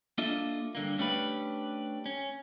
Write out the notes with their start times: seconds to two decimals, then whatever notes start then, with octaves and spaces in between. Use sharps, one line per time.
0.18 A#3 D4 F4 A4 D#5 E5
0.75 G2 D3 A#3
0.98 A3 C#4 D4 G4 B4
2.06 C#4